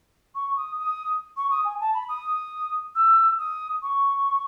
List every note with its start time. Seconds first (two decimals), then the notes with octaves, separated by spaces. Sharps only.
0.35 C#6
0.56 D#6
0.78 D#6
1.36 C#6
1.50 D#6
1.64 G#5
1.80 A5
1.93 B5
2.08 D#6
2.95 E6
3.38 D#6
3.82 C#6